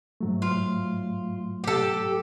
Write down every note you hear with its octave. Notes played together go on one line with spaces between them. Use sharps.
G#2 F#3 A3
F4
G4 A4